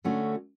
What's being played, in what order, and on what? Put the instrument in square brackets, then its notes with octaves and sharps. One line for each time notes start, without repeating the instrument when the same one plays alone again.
[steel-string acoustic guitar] D3 A3 C#4 F#4